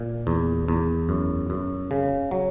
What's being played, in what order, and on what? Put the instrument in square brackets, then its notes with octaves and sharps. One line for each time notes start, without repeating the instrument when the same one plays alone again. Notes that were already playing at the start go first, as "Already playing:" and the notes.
Already playing: [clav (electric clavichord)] A#2
E2
E2
F#2
F#2
C#3
F#3